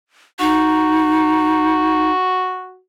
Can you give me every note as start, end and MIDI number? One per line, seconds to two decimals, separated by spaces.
0.40 2.10 63
0.40 2.79 66